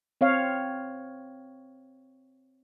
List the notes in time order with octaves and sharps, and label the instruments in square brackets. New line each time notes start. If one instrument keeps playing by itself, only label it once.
[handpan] C4 C#5 F5